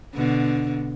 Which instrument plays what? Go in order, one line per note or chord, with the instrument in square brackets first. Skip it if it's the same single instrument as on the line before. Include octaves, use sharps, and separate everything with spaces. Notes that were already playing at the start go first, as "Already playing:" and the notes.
[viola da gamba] B2 D3